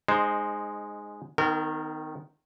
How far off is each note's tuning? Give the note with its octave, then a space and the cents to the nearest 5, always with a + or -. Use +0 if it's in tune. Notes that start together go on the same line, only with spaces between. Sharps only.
G#3 +0 D#4 -15 C5 +0
D#3 +0 B3 +45 A#4 -35